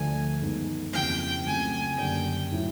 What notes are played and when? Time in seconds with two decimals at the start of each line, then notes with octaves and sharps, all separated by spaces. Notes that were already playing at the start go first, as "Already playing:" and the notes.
Already playing: D2 D3 F3 A3 G#5
0.41 G2 D#3 G#3 B3 D#4
0.93 F2 C#3 E3 G3 A#3 G5
1.46 C#2 C#3 F#3 A3 C4 G#5
1.97 F#2 D3 G3 A#3 D4 G5
2.52 A2 F#3